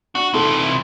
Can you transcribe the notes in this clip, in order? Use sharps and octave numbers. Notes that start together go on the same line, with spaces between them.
D4 F#4
C3 E3 D#4 F4 A4